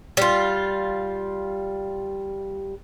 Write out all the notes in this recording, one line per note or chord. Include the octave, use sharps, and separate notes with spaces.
G3 F4